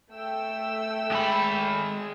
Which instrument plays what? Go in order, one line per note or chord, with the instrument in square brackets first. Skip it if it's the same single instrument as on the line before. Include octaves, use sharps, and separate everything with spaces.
[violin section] A3 G5 E6
[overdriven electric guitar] G#3 B5